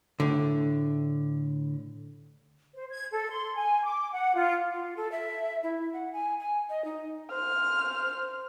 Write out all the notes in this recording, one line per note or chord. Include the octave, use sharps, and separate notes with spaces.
A2 D3
C5
G#6
A4
C6
G#5
D6
F#5
F4
F4
A4
E5
E4
F#5
G#5
G#5
D#5
D#4
C5 F6